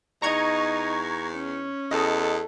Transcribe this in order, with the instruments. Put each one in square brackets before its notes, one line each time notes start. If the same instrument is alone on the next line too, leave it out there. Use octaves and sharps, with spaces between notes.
[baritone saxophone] E2 [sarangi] D#4 [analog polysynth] A#5 C#6 G#6
[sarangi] C#4
[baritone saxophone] E2 [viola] A4 [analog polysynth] D#5